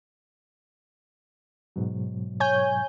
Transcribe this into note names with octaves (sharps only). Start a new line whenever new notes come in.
G#2 B2 F#3
C#5 G#5 G6